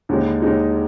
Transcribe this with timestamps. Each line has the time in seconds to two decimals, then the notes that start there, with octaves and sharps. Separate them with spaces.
0.09 D#2 D3 G#3 D#4
0.42 D#2 D3 G#3 D#4